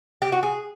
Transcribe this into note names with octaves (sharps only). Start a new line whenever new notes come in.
G4
F#4
G#4